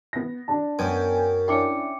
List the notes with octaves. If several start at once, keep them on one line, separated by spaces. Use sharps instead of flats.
B3 A#6
D4 D5 A5
F#2 B3 G5 G#5
C#4 D4 E4 G5 D6 C#7